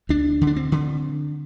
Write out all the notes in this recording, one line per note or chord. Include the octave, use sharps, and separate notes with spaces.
D2 D4
D3
D4
C4
D3